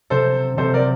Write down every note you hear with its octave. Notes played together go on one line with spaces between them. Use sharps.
C3 F#3 C4 A4 C5
C3 F#3 C4 A4 C5
A#4 D5